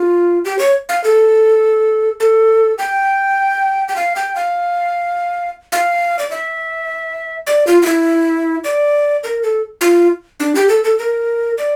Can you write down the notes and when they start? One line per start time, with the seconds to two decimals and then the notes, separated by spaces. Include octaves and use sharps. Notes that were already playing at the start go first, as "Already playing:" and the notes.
Already playing: F4
0.45 G4
0.59 C#5
0.89 F5
1.04 A4
2.20 A4
2.78 G5
3.88 G5
3.96 F5
4.16 G5
4.36 F5
5.72 F5
6.19 D5
6.31 E5
7.47 D5
7.67 F4
7.82 F4
7.86 E4
8.64 D5
9.24 A#4
9.43 A4
9.81 F4
10.40 D4
10.55 G4
10.69 A4
10.84 A4
10.99 A#4
11.58 D5